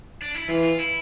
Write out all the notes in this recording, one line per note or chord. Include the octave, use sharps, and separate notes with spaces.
D4
E4
E3 F4
F4
E4